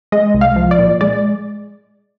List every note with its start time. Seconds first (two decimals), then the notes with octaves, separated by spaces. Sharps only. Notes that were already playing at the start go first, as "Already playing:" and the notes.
0.12 G#3 D#5
0.34 C2
0.41 F5
0.56 F3
0.71 D5
0.79 A#2
1.01 G#3 D5